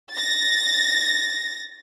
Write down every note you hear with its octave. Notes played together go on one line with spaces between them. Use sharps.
A6 A#6